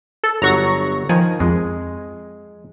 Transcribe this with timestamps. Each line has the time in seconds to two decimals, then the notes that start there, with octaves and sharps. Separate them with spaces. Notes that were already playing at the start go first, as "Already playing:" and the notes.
0.24 A4
0.42 G1 F#3 F#5 A#5 C#6 A#6
1.09 D#3 F3 G#5
1.40 F2 G#3